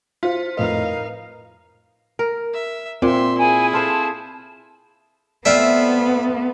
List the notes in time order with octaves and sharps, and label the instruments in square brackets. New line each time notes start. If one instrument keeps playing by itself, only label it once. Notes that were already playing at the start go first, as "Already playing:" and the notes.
[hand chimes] E4 C5 B6 [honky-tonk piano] F4
[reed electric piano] F2 A2 D#5 [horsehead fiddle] D#4 F5 [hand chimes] A#4 B4
[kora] A#4
[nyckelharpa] E5
[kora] A#2 [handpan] C4 [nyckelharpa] E5 C6
[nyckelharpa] E4 G#4 [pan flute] G#5
[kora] F4 A4 C5 [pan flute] A5
[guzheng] A3 C4 F4 [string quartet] B3 [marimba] D5 [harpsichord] E5 F5